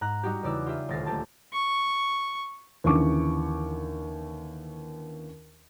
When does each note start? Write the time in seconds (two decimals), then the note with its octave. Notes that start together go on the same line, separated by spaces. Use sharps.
0.01 G#2 A#5 F#6
0.23 G3 D#4 F#4 G4
0.43 E2 C#3 D#4 D5 E6 F#6
0.66 F4 G4 E5
0.89 D#1 D2 G#3 A6 A#6 C7
1.06 A3 A#3 G4 A5
1.53 C#6
2.84 D#2 D3 E3 C#4 C#6 D6